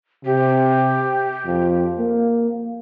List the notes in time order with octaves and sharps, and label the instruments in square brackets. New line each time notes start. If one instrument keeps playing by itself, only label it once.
[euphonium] C3 [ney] G4
[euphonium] F2
A#3